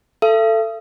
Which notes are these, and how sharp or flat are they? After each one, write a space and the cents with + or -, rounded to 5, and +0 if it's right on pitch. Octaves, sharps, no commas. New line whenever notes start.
A4 +10 E5 +45